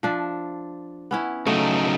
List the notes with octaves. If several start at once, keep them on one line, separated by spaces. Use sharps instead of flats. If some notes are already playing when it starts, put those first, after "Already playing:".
F3 D4 E5
B3 C#4 E4
C#3 F#3 A3 D#4